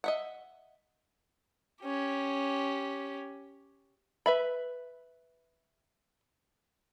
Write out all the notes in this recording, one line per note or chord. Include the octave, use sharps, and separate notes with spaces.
D#5 E5 F#5
C#4 G4
B4 E5 B5